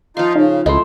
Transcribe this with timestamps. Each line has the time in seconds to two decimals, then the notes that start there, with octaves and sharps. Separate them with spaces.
0.17 F3 D#4 F4 F5
0.35 C#3 D#4
0.66 C#2 A3 E4 D#5 C6